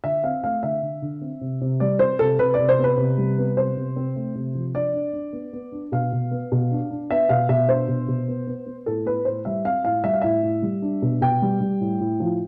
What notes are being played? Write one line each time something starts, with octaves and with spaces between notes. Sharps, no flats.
D3 E5
C4 F5
A3 F5
D3 E5
D3
D3
C4
C3
C3
G3 D5
C4 C5
C3 A4
C3 B4
D5
C3
C5
B3
B4
C3
G3
B3
C3 C5
C3
C4
A3
C3
F3
D4 D5
D4
D4
B3
B3
D4
B2 F5
B2
B3
B2
D4
D4
B3 E5
B2 F5
B2 E5
D4 C5
B2
B2
B3
B3
B3
A2 A4
B3 B4
A2 C5
G3 E5
C4 F5
A2 F5
G3 E5
F5
A2 E5
A2
G3
D4
B2
B2 G5
G3
G3
A2
A2
F3